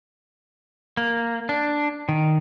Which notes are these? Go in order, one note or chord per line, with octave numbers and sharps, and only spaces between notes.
A#3
D4
D#3